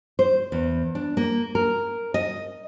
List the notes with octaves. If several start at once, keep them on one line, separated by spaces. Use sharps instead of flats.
C5
E2
D4
A#3
A#4
D#5